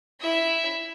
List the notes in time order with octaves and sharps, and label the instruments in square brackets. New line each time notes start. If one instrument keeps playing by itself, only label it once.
[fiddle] E4 E5